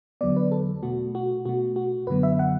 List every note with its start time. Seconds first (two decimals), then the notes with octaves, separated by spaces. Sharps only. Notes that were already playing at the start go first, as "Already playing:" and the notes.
0.21 E2 D3 F#3 B3 D5
0.36 B4
0.51 A4
0.83 B2 A3 F#4
1.15 F#4
1.45 B2 A3 F#4
1.76 F#4
2.07 F#2 D3 F#3 B3 B4
2.23 E5
2.39 F#5